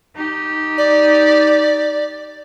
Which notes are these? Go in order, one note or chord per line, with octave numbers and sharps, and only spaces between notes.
D#4 G4
D5